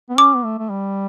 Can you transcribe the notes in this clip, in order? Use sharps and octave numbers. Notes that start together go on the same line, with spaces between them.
B3
C#4 D6
B3
A3
A3
G3